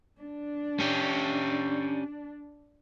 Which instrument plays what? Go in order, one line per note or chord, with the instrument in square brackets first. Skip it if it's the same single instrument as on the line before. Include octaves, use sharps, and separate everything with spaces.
[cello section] D4
[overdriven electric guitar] C#4 G4